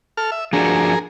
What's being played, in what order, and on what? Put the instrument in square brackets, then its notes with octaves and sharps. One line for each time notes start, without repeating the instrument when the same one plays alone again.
[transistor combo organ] A4 F6
E5
[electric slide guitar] F3 D4 F#4 [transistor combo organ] G#4 A#4